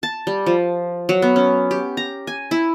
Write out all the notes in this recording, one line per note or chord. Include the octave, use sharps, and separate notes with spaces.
A5
G3
F3
F#3
B3
C#4
G4
A#5
G#5
E4